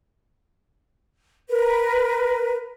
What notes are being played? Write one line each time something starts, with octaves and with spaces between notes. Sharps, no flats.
A#4 B4